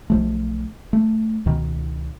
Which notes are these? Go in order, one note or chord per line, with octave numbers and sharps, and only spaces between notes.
B1 F3 A3
A3
C#2 B2 D#3